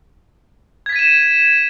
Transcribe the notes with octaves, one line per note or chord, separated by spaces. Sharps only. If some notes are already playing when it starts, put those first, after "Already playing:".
G#6 A6 B6 D#7 E7